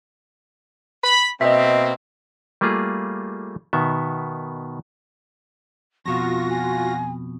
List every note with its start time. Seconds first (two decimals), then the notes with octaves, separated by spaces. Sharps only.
1.04 B5
1.41 B2 A#3 C4 D#5 E5
2.61 G3 A3 A#3 F4 G#4
3.73 B2 D#3 B3 E5
6.06 F2 B2 F4 F#4 C#6 A#6
6.50 G#5